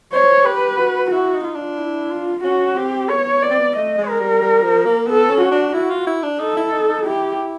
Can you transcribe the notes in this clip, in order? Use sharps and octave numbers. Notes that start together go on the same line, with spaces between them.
C5 C#5
G4 B4
F#4
E4 F#4
D#4
F4
D4
E4
F4
C#4 F#4
C4 G4
B3 C#5
B3 D5
C4
B3
A3 D#5
G#3
A#4
G3
G3
F3
A#3
B3 A4
C#4
F#4
D4
E4 F#4
F4
E4
D4
D#4 A4
E4
D#4
D#4
E4 G4